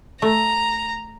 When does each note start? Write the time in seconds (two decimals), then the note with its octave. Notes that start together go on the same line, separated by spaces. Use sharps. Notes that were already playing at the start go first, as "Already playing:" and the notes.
0.22 A3 A#5